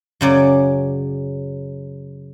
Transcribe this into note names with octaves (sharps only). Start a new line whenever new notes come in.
F#2 C#3 D5